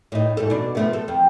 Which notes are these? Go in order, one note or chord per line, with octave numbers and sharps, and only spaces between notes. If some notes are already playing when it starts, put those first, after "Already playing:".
A2 D#4
E2 G#2 A4
B2 D4
F3 A3 B3
A4
F2